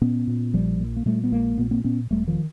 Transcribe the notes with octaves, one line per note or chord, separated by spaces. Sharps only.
A#2 B3 C#4
A#2
A#1 F3 G3
A#2
A#3
A#2 G3 A3
B3
A#1 G#3 A#3
A#2 A3 B3
A#3 C4
A#2 B3 C#4
E1 G3 A3
D#3 F3